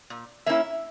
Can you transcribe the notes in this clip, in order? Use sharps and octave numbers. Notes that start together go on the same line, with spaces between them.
A#2
A#3 C#4 E4 E5